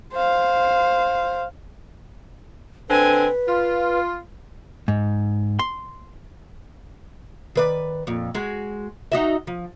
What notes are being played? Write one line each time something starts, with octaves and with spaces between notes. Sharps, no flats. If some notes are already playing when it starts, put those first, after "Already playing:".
C5 F5
D3 C4 B4 G#5
F4
G#2
C6
D#3 B4 D5
F2 A#2
G#3 F#4
D#4 F#4 E5
F3